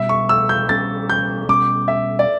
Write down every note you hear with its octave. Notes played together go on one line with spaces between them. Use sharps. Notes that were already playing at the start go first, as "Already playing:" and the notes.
Already playing: B2 G3 C#4 E5
C#6
E6
G6
B2 G3 C#4 A6
G6
B2 G3 C#4 D6
E5
D5